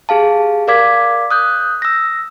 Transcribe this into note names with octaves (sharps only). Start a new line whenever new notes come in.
G4 G#4 F5 A5
A#4 D5 F5 D6 G#6 B6
D#6 F#6 G6
E6 A#6